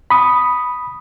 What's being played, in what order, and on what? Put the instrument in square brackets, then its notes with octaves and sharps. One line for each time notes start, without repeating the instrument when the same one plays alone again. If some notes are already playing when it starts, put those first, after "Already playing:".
[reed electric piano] B5 D#6